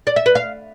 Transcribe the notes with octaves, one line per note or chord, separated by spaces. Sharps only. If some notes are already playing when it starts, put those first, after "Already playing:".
D5
E5
B4
F5